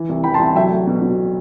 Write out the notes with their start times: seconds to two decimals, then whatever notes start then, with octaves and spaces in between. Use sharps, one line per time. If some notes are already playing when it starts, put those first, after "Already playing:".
Already playing: E3
0.09 C2
0.24 E3 G5 B5
0.34 A5 C6
0.39 C2
0.55 F#3 E5 G5
0.71 A3
0.87 B2
1.02 B2